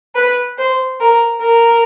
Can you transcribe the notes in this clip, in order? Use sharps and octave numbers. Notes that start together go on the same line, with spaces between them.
B4
C5
A#4
A#4